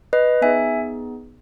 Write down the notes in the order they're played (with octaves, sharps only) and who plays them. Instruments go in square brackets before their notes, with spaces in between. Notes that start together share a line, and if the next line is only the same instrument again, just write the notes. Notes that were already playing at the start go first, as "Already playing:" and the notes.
[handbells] B4 D#5
B3 D#4 G#4 E5 G#5